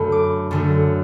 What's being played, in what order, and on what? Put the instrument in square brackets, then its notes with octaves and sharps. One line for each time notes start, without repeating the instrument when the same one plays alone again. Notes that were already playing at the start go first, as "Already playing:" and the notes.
Already playing: [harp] F#2 D3 A3 A5 B5
D6
F#2 D3 A3